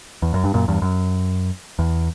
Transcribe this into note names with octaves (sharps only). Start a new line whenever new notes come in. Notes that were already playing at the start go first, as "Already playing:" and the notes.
E2
F#2
G2
F#2 A#2
E2 G2
F#2
E2